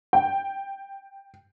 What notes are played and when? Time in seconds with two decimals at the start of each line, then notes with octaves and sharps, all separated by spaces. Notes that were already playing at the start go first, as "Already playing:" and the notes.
0.13 G5